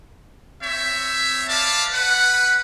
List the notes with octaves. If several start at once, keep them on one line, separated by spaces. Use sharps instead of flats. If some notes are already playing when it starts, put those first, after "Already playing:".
C4 C#5 E5
B4 D5 F5 A5
B4 F#5